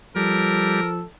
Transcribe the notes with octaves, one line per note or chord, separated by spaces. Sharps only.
F3 G3 A4 A#4